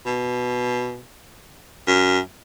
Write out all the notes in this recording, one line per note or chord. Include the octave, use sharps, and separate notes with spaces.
B2
F#2